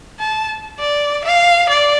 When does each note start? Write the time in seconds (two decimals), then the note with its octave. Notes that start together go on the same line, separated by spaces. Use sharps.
0.20 A5
0.80 D5
1.25 F5
1.69 D5